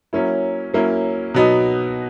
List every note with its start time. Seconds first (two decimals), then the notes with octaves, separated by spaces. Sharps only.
0.13 F#3 A#3 C#4 E4
0.73 F#3 A#3 C#4 E4
1.34 B2 F#3 B3 D#4